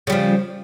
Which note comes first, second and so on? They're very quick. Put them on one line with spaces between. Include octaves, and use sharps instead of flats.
C#3 G3 F3